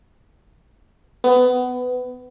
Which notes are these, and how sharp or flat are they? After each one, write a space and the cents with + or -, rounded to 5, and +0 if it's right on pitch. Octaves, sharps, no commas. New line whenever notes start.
B3 +20